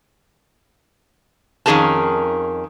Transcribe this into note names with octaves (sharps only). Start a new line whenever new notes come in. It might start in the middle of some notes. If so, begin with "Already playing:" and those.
F2 D#3 C#4 G#4 A#4 A5